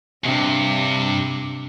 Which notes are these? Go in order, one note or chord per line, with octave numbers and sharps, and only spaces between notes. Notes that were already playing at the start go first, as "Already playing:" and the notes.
E2 G2 C3 D4